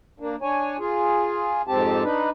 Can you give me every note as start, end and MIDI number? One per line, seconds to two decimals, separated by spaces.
0.20 0.36 58
0.20 0.36 62
0.42 0.77 62
0.42 0.77 73
0.42 0.77 80
0.79 1.62 65
0.79 1.62 68
1.68 2.03 41
1.68 2.03 44
1.68 2.03 60
1.68 2.03 67
1.68 2.03 81
2.03 2.30 62
2.03 2.30 63
2.03 2.30 71